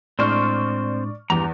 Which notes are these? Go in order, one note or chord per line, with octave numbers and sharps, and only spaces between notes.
A2 G#3 C4 D4 C5 D5 C#6 F6
E2 G2 G4 A#5